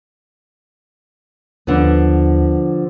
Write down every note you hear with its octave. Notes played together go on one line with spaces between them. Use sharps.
D#2 D3 F3 B3